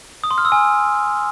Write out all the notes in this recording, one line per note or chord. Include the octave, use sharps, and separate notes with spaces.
D#6
C6
F6
E6
G#5